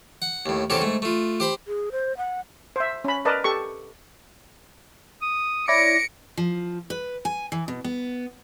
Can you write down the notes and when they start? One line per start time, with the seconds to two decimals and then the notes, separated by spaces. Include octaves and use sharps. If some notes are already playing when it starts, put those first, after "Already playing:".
0.22 F#5
0.46 D#2 A2
0.70 E2 C3 C#4 G4 A4
0.82 G#2 A3
1.02 A3 F4
1.40 G4 C5 B5
1.67 G#4
1.92 C5
2.17 F#5
2.76 C5 E5
3.04 C#4 B5
3.25 A#4 B4 D5 D#5 A5
3.44 G4 A4 C#6
5.22 D#6
5.68 E4 C#5 D5 A#6 C#7 D7
6.37 F3
6.90 B4
7.25 G#5
7.52 E3
7.68 B2
7.84 B3